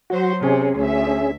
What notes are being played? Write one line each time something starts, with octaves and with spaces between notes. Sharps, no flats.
F#3 F#4 C5
C3 C#4 G#4
D2 E5